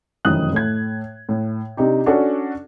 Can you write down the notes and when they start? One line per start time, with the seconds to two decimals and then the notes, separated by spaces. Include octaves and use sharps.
0.25 F1 F#2 D#3 E3 D#6 F#6
0.52 A2 A3 G#6
1.29 A2
1.77 C3 D4 D#4 G4
2.06 C#4 D4 F#4 A4